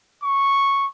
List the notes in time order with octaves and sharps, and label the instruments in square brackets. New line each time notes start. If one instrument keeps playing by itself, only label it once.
[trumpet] C#6